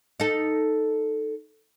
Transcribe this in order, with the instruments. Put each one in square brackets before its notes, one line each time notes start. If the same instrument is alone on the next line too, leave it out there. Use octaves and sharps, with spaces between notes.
[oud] D#4 A4